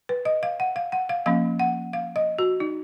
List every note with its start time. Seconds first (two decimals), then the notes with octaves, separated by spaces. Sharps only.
0.09 B4
0.25 D#5
0.43 F5
0.60 F#5
0.76 F5
0.92 F#5
1.09 F5
1.26 F3 A#3 C#4 F5
1.60 F#5
1.93 F5
2.16 D#5
2.38 F#4
2.60 D#4